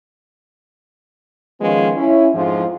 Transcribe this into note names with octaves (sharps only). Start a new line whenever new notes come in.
D#3 F3 G#3 B3 C#4 F4
C#4 E4
F2 G#2 F3 C4 F4